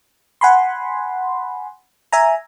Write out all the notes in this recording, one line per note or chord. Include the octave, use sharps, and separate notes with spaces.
F#5 G#5 B5 C6
E5 G#5 A#5